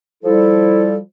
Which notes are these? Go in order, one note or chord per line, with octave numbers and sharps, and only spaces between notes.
F3 G3 E4 A4